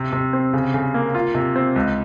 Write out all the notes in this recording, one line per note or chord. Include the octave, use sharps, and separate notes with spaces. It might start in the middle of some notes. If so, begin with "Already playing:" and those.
Already playing: C3
C3
C4
C#3
C#3
A#3
F4
C3
C4
C#2